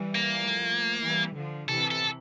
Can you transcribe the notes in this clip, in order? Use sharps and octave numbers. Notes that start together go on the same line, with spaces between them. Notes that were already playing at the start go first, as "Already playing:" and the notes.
Already playing: E3 G3
A#3
F3 A3
E3 G3
D3 F3
C3 E3 A4
A4